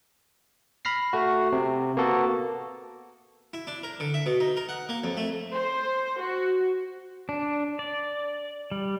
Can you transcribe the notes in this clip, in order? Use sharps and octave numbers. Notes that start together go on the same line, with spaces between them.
B5 F6 A#6 C7
A3 F#4
C3
A#3 B3 F#4 A4
E4
D4
A#4
D3
E5
B2
D#4
A#4
F#5
A#3
F2
A3
C5
F#4
D4
D5
G3